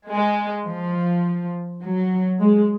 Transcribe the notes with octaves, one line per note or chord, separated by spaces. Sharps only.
G#3
F3
F#3
G#3